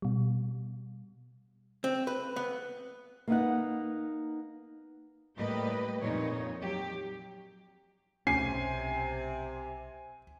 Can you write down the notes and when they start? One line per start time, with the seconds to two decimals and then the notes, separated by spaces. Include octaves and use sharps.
0.02 B2 G3
1.84 C4
2.07 B4
2.36 B3
3.28 A#3 B3 D#4 F#5
5.36 A2 G3 A#3 G4 B4 D#5
6.01 F2 A#2 D#4 C#5
6.59 F#3 G4
8.27 B1 C3 A3 C#4 G#5 C7